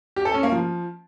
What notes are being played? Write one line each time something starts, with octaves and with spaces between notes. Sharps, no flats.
G4
A4
C#4
A#3
F3